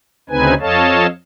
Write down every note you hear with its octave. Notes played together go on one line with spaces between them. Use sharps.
D2 C#3 C4 D#4 B4 G#5
F2 A4 C#5 D#5 F5 A5